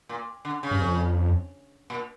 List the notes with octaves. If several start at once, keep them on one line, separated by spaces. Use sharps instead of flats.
A#2
D3
C#3
G2
F2
A#2